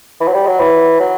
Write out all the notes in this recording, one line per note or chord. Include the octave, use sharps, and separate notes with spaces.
E3
F#3
G3
F#3
E3
F#3